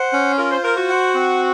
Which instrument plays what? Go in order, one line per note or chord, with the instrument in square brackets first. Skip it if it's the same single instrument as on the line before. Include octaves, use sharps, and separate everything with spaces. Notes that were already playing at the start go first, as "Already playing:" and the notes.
Already playing: [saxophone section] C5 [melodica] F#5
[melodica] C#4
[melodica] F4 [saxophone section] A#4
[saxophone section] C5
[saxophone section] A#4 [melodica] C5
[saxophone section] F#4
[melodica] F#5
C4